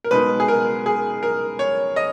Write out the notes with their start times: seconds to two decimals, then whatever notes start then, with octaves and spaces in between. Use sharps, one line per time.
0.04 A#4
0.11 B2 G#3 B3 D#4 B4
0.40 G#4
0.48 A#4
0.86 G#4
1.23 A#4
1.59 C#5
1.96 D#5